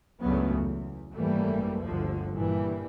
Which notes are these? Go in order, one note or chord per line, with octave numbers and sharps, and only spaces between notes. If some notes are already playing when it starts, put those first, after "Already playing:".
C#2 G2 C#3 F#3 A3 B3
E2
G#1 F#2 E3 G3 A3 A#3
G1 D2 D3 F3
G2 A#2 E3 G3